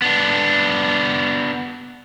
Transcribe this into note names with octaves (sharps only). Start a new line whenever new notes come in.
B3 D4